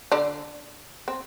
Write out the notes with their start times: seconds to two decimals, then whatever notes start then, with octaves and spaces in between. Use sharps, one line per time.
0.12 D3 D4
1.08 C4